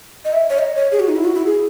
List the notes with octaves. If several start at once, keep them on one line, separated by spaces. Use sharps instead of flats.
D#5
E5
C#5
D#5
C#5
G#4
F#4
D#4
E4
F#4
E4
G#4